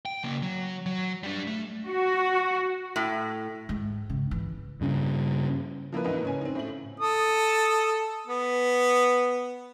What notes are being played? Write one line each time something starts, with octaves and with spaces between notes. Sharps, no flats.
G5
C#3 A#3
F#3
F#3
G3 D4
A3
F#4
A2
G#2
C#3
E3
G2 C#3
F3 A#3 E4 B4
C#2 G#2 E3 A#3 B4 D#5
C#3 C#4 G#5
C4 D#4
A2 F#7
A4 D#6
B3